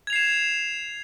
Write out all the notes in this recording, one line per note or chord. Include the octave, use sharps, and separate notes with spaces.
G#6 C7 E7 F7